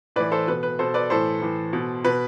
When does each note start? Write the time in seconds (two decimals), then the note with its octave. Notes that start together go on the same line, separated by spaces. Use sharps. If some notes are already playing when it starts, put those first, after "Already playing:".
0.16 A2 E3 B4 D5
0.32 A4 C5
0.47 B2 B4
0.63 B4
0.79 B2 A4 C5
0.94 B4 D5
1.10 A2 E3 A4 C5
1.42 A2 E3
1.73 B2
2.04 B2 B4